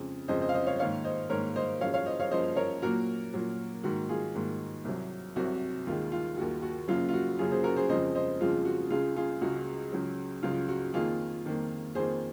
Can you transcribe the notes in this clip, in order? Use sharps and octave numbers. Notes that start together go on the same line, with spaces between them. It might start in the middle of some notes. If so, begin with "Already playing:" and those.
Already playing: F2 C#3 G#3
F2 C#3 G#3 C5 D#5
C5 D#5
F5
C5 D#5
C#5 F5
G#2 D#3 A#3 C#5 F5
C5 D#5
G#2 D#3 A#3 A#4 C#5
C5 D#5
F#2 F3 G#3 C#5 F5
C#5 F5
C5 D#5
C#5 F5
F#2 F3 G#3 C5 D#5
A#4 C#5
A#2 F#3 A#3 F#4 A#4
A#2 F#3 A#3
G#2 D#3 A#3 F#4
F4 G#4
G#2 D#3 A#3
C2 C3 F#3
C2 C3 F#3 F#4
D#2 D#3 G#3 F4
F4
D#2 D#3 G#3 F#4
F#4
F#2 C#3 F#3 A#3 F4
F4
F#4
F#2 C#3 F#3 A#3 F4 G#4
G#4 C5
F#4 A#4
G#4 C5
F2 C#3 F3 G#3 C5 D#5
C5 D#5
F2 C#3 F3 G#3 F4
F#4
C#2 C#3 G#3 F4 G#4
F4 G#4
C#2 C#3 G#3 F#4
C#2 C#3 F#3
C#2 C#3 F#3 F4
F#4
F2 D#3 A#3 F4 G#4
F2 D#3 A#3
F2 D#3 A#3 G#4 C5